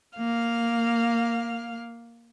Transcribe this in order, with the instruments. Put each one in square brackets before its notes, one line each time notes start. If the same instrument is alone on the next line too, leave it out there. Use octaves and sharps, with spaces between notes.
[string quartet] A#3 F5 F6